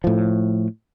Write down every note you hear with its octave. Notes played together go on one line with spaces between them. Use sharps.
A2 F3